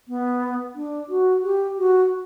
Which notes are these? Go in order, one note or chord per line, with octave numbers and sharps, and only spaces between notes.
B3
D4
F#4
G4
F#4